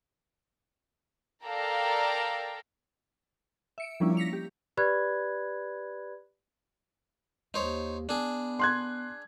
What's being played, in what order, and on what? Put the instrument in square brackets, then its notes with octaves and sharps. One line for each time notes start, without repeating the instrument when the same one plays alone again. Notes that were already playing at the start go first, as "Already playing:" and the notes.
[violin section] A4 A#4 D5 F5 G5 A#5
[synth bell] E5 C#7 D7
F3 G3 A#3 C#4 D4 E4
A#6 B6 C#7 F7
G4
[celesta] G4 B4 D5 B5 F#6 G#6
[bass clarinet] D#2 [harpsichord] D#4 C5 C#5
[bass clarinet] B3 [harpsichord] D4 G#4
[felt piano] C6 F#6 G#6